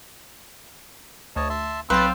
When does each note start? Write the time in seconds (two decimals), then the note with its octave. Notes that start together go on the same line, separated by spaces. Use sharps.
1.36 D2 C#5 D#5 A5
1.50 E5 A5 C6
1.90 B1 F#3 C4 B4 C5 F5 A6